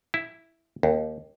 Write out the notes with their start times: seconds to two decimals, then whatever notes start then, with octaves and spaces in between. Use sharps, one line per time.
0.14 E4
0.83 D#2